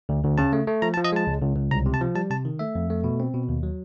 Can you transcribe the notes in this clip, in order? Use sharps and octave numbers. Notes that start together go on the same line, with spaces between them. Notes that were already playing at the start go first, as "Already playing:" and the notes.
D2
D2
C#3 A5
A3
A3
F3 A#5
A5
F3
D#5
G#3 A5
C#2
C#2
C#2
C2 A#5
C3
A5
F3
G3 A5
C3 A5
D#3
A3 E5
F2
A3
B2
C4
B2
D#2
F#3